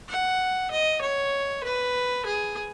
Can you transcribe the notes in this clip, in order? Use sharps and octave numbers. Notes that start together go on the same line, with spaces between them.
F#5
D#5
C#5
B4
G#4